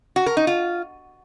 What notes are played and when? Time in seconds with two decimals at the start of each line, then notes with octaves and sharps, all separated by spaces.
0.16 F#4
0.26 A#4
0.37 D#4
0.47 F4